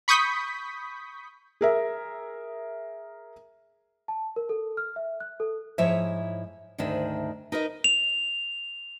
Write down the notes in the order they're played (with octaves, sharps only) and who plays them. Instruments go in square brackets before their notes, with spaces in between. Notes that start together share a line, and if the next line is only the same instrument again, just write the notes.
[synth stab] B5 C#6 D#6 G6 B6
[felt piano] G#4 A#4 E5
[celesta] A5
A#4
A4
F6
E5
F#6
A4
[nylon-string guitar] G#2 F3 E4 C#5 E5
D2 G#2 D#3 D4 E5
D#4 A#4 B4 D#5
[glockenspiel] F7